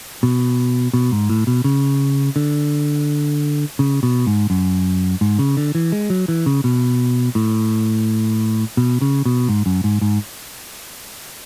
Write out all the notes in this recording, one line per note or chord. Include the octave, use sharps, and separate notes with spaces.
B2
B2
G#2
A2
B2
C#3
D3
C#3
B2
G#2
F#2
G#2
C#3
D3
E3
G#3
F#3
E3
C#3
B2
A2
B2
C#3
B2
G#2
F#2
G#2
G#2